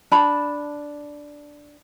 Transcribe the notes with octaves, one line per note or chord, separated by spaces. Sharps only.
D4 A5 B5